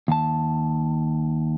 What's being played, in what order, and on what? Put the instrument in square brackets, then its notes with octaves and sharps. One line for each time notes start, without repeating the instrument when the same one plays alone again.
[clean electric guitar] D#2 A5